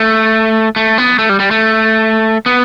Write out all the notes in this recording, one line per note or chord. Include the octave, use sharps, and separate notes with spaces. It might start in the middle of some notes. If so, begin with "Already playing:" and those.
Already playing: A3
A3
B3
A3
G3
G3
A3
B3